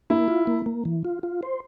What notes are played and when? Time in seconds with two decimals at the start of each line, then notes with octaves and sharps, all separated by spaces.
0.10 A#3 E4
0.28 F4
0.47 A#3
0.66 A#3
0.85 E3
1.05 F4
1.23 F4
1.43 C5